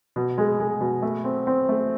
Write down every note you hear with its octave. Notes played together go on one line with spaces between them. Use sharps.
B2
G#3
G#3
B2
A3
C4
C4
A3